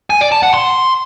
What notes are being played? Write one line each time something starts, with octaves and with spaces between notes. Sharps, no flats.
G#5
D5
A5
F#5
C6